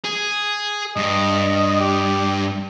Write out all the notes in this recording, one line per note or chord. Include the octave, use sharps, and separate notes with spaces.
G#4
G2 D#5
G4